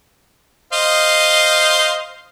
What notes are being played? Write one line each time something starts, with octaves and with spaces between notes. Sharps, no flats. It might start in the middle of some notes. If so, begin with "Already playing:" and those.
C5 D#5 F5